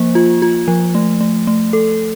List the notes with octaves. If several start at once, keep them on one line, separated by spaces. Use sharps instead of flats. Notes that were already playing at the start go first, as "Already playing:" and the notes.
Already playing: F3 A#3 C5
F4
F4
F3
A3
A3
A3
A4